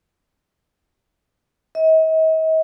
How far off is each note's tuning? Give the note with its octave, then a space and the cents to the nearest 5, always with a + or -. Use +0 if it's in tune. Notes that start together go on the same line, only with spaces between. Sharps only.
D#5 +45